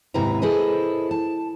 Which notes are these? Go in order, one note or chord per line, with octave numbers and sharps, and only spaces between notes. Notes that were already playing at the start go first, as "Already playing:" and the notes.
D#2 G#2 C3 E4 B4 A#5
E4 G#4 A4 B4 C5 D#5
A5